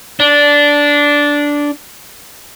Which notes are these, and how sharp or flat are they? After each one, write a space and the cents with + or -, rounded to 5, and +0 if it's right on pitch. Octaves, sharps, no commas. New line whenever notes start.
D4 -10